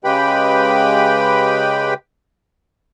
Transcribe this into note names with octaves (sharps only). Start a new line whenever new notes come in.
C#3 G#3 G4 B4 G5 B5